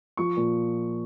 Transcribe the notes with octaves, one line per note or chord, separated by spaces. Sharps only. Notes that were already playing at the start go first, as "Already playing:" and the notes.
F3 C#6
A#2